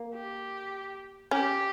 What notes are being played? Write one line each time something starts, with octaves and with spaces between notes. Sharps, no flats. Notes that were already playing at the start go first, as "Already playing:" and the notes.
Already playing: A#3
G4
C#4 G4